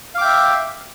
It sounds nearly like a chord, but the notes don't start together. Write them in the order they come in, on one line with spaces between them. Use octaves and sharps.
F5 D6 G5 E5